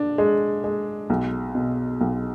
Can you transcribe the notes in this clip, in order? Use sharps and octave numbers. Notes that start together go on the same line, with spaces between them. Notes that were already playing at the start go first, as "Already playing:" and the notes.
Already playing: D4
G#3
G#3
B1
B2
B1